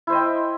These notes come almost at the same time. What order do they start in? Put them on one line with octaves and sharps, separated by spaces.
E4 C5 D#5 G5